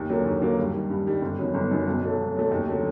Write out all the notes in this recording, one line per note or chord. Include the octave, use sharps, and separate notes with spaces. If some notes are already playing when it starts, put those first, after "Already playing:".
Already playing: D#2
D3 F#3 A#3
D#2
D3 F#3 A#3
G2
D#3 G3
G2
D#3 G3
G1
F#2 D#3 F#3 B3
G1
F#2 D#3 F#3 B3
B1
B2 F#3 A3
B1
B2 F#3 A3
D#2
D3 F#3 A3